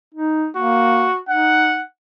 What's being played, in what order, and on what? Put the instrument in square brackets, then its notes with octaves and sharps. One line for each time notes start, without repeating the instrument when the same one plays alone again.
[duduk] D#4
[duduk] A#3 [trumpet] F#4
[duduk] D#4 [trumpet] F#5